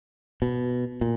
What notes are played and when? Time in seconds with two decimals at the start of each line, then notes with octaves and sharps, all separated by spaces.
0.42 B2
1.01 A#2